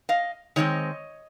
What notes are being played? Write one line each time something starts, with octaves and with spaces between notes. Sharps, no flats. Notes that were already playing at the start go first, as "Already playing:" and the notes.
D#5 F5
D#3 G#3 C4 C#5 D#5